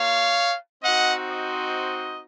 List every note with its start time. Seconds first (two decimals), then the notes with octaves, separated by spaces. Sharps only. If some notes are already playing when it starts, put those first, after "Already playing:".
Already playing: A#3 F4 C#5 F5
0.83 C4 D#4 F#4 D#5 F#5
1.28 C5 D#5